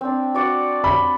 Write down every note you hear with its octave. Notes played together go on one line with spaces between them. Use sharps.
C4 D4
F#4 D5 F#5
B5